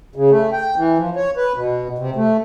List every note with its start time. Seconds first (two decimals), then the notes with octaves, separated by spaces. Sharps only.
0.16 C#3
0.31 A3
0.53 G5
0.77 E3
0.98 F3
1.16 C#5
1.37 B4
1.56 B2
1.98 C3
2.16 A3